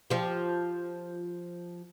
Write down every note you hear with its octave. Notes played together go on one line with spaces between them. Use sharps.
F3 G4